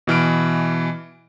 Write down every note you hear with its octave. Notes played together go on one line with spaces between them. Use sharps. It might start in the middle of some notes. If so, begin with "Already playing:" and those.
B2 E3 F6 D7